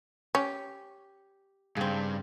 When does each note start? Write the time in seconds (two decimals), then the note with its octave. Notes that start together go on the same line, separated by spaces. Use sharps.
0.35 C#4 G4
1.77 G2 C#3 C4